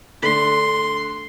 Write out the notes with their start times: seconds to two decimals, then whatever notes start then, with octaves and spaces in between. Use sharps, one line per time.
0.23 D3 A3 D4 C6